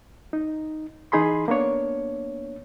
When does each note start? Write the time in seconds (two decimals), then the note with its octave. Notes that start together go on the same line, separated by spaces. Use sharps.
0.33 D#4
1.12 E3 D#4 G#4 B5 C6
1.48 A#3 B3 D4 C#5